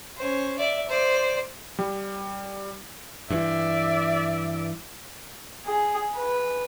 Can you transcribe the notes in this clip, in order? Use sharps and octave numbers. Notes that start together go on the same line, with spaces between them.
C#4 C5
D5 E5
C5 D5
G3
G2 E3 D5 E5
G#4
B4